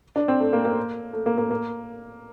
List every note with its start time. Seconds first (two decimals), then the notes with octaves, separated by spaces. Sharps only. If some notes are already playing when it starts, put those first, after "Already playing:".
0.16 D4
0.28 C4
0.40 A3
0.53 A#3
0.65 A#3
1.13 A3
1.26 A#3
1.38 A#3
1.51 A#3